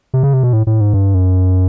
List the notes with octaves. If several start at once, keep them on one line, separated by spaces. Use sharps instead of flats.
C3
C#3
C3
B2
A2
A2
G#2
G2
F#2